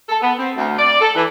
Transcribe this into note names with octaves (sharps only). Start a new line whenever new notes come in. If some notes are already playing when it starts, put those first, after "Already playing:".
A4
B3
C4
D2
D5
A4
E3